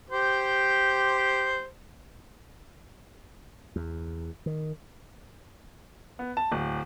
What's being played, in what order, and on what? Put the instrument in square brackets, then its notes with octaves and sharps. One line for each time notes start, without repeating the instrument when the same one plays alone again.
[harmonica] G4 C5
[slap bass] E2
D#3
[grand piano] B3
A5
D1